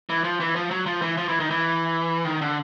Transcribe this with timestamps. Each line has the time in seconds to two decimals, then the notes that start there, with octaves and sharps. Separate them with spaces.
0.10 E3
0.24 F3
0.40 E3
0.56 F3
0.71 F#3
0.86 F3
1.02 E3
1.17 F3
1.29 E3
1.40 D#3
1.50 E3
2.25 D#3
2.41 D3